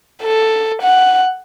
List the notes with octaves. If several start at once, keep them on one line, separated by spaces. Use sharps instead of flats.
A4
F#5